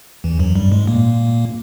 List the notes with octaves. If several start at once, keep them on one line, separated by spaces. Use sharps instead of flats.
E2 E3
F#2 F#3
G2 G3
G#2 G#3
A#2 A#3